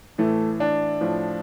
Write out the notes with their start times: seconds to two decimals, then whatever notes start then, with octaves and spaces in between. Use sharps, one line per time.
0.18 A2 E3 A3
0.60 D4
1.01 A2 F3